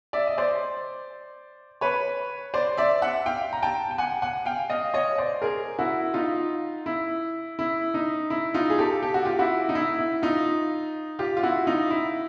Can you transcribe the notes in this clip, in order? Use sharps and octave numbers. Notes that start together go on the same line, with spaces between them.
D5 E5
D#5
C5 D5
B4 C#5
C5 D5
D5 E5
E5 F#5
F5 G5
A#5
G5 A5
G5
F#5 G#5
F#5 G#5
F5 G5
D#5 F5
C#5 D#5
C5 D5
G#4 A#4
E4 F#4
D#4 F4
E4
E4
D#4
E4
D#4 F4
G#4
G4 A4
G4
F#4
F4 G4
E4 F#4
D#4
E4
E4
D#4 F4
F4 G4
F4
E4 F#4
D#4 F4
E4